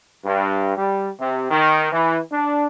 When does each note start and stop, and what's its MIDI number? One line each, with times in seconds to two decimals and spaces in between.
0.25 0.73 43
0.77 1.09 55
1.20 1.49 48
1.51 1.91 51
1.92 2.18 52
2.32 2.67 62